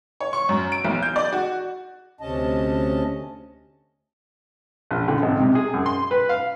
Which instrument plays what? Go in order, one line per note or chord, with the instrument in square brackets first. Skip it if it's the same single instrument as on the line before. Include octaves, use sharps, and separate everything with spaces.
[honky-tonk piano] C#5
C#6
F#2
D7
B1
G6
D5
F#4
[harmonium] D2 C3 C#4 D#5 A5
[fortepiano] A#1
D3
G#1
C3
G#4
F#2
C6
B4
F5